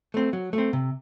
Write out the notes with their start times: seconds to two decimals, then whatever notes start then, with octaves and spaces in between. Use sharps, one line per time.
0.14 A3 C4
0.33 F#3
0.53 A3
0.58 C4
0.73 C3